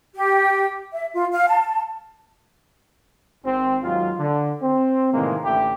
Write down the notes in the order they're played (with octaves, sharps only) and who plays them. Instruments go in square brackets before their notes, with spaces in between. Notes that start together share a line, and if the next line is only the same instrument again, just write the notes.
[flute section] G4
E5
F4
F5
A5
[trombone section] G#1 C4
D#2 G#2 F#3 F4
D3
C4
A2 C3 D#3 E3 G#3 A#3
A1 D3 A3 E4 G4